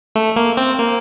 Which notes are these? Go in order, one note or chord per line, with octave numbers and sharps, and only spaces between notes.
A3
A#3
C4
A#3